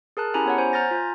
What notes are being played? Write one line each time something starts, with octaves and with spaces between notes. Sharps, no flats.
G#4 A#4 A5 F#6
C#4 E4 G4 G#5 A#5 B5
B3 C#5 F#5
C5 G#5
G#5 A#5 F6 G6 A6 A#6
F4